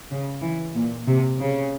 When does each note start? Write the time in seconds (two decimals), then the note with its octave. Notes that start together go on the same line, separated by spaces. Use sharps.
0.11 C#3
0.42 E3
0.75 A#2
1.07 C3
1.39 C#3